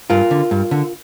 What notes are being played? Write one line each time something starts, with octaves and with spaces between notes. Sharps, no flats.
G2 F4 A#4
D3
G2
D3